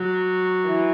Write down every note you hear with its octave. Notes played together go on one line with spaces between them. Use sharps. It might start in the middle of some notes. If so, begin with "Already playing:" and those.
Already playing: F#3
E3